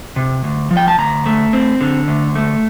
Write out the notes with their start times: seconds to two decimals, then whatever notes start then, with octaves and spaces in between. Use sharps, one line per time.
0.16 C3
0.44 D2
0.71 F3
0.77 G5
0.88 A5
0.98 D2 A#5
1.26 A3
1.53 C4
1.81 D3
2.08 D2
2.35 A3